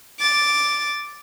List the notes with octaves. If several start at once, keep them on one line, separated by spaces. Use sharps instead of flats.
D6 A6